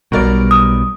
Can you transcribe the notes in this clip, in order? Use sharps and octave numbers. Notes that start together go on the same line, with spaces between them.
B1 B2 G3 F#4 A#4 D5
D#6